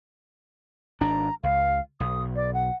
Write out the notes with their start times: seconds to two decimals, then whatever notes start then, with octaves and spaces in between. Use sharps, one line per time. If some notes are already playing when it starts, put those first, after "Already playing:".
1.01 G#1 D4 A#5
1.43 C#2 F5
2.00 B1 D#6
2.36 D5
2.54 F#5